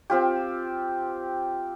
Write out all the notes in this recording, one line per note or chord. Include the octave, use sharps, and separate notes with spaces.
C4 F4 G4